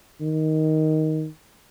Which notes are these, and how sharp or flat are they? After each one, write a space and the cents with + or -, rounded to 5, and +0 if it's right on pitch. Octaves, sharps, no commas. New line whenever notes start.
D#3 +10